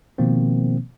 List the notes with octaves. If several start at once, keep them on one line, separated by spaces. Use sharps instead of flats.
B2 D#3 F3 A#3 C4